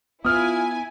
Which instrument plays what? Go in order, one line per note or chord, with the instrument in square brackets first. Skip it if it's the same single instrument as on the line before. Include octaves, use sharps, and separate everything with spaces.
[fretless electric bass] B3 [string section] E4 G#5 [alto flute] F4 [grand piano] D#6 F6